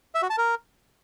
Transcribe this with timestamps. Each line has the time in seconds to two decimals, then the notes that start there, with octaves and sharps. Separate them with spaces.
0.15 E5
0.22 F#4
0.30 A5
0.38 A#4